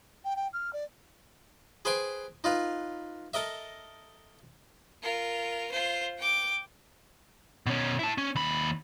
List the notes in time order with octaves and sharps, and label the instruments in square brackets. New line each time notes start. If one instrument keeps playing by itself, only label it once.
[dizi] G5
G5
F6
D5
[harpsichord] G#4 B4 C5 G5 G#5
D#4 F4 B4
A4 A#4 D#5 E5
[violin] F4 A#4
F4 C5
G5 D6
[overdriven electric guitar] B2 C#4
E4 A5
C#4
D#2 B5